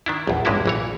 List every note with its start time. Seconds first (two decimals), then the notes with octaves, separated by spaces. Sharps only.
0.06 D#3 D4 E4
0.27 A#1 E2
0.45 A1 G2 G#3 A#3 E4 E5
0.66 A#1 E3 C#5